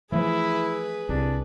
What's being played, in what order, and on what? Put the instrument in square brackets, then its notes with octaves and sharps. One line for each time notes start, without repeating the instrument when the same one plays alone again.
[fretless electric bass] E3 F3 A3 [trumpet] E4 [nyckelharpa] G#4 B4
[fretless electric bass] C2 [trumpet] D4